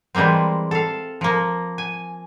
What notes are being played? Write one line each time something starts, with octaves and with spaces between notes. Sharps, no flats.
E3 G3 G#3 A#3 C4
A4 F5
F3 A#3
G#5